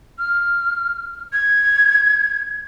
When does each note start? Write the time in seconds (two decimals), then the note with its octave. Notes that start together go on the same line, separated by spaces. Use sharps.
0.19 F6
1.33 G#6